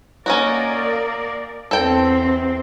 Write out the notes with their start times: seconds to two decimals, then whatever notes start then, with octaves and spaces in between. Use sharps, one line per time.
0.26 A#3 C#4 D#4 F#4 A#4 D5
1.71 E2 C4 A4 G5